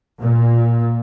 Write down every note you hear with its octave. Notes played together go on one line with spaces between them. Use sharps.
A#2